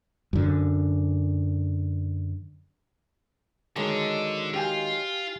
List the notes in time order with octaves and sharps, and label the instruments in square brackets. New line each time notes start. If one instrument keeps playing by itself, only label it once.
[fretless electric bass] F#2 D3
[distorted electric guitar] D3 [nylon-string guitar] D#3 F#3 G#3
[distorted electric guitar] F4 [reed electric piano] G4 G5 G#5